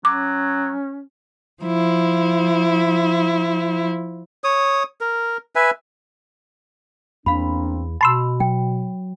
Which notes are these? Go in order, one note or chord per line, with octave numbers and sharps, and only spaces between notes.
F#3 C#4 D6
F3 E4
C#5 D#6
A#4
B4 E5 G#5
E2 A#3 C4 D4 F5 B5
B2 A5 B5 C6 E6
F#3 G5